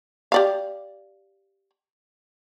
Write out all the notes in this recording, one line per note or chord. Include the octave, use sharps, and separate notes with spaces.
G4 D5 F5